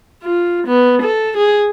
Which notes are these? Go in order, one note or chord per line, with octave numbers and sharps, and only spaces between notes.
F4
B3
A4
G#4